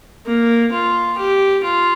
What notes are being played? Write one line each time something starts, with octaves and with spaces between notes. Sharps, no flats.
A#3
F4
G4
F4